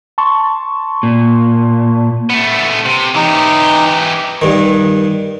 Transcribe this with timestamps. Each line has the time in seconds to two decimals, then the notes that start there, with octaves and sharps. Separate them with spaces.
0.18 A5 C6 C#6
1.03 A#2
2.30 A3 B3
2.86 C3
3.15 E3 D#4 G4
4.42 G2 D#3